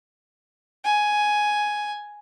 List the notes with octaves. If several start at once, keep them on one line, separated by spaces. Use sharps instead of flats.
G#5